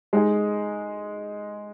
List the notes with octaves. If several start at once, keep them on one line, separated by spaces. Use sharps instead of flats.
G#3 D#4 G#4